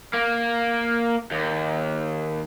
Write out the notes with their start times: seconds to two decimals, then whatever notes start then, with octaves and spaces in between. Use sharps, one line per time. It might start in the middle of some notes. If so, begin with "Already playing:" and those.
0.13 A#3
1.32 D#2